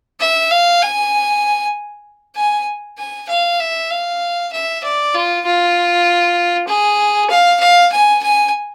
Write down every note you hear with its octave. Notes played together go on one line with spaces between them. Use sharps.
E5
F5
G#5
G#5
G#5
F5
E5
F5
E5
D5
F4
F4
G#4
F5
F5
G#5
G#5